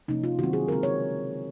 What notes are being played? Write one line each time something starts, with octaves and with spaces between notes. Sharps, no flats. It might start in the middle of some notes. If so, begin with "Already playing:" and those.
C3 F3 A#3 C#4 D#4
F4
D#3 F#3 C4 F#4
G#4
C#3 G#3 C4 A#4
C#5